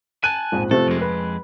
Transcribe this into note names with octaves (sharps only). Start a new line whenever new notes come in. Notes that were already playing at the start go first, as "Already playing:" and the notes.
G#5 A5 F#6
A#1 F2 G#2
C3 F3 A3 A4
F2 G#3
B4